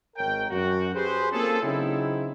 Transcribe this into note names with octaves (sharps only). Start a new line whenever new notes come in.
G#1 D#3 A#4 C#5 G5
F#2 F#4
G4 G#4 B4 C5
A#3 C4 C#4 F4 G#4 A4
C#3 F#3 C4 D#4 E4